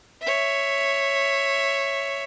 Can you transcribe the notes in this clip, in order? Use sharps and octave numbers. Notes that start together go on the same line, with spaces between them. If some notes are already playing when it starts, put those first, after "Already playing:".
C#5 E5